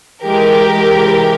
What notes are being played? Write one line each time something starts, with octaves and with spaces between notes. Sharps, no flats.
E3 G#3 G4 A#4
C3 E3 G#3